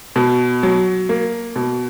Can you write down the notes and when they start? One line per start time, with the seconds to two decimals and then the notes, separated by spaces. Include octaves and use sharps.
0.16 B2
0.63 F#3
1.09 A#3
1.56 B2